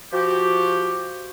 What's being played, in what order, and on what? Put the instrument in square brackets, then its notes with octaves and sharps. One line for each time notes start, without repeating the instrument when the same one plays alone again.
[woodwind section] F3 F#4 G4